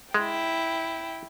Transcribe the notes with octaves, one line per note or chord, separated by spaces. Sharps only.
G#3 E4 G5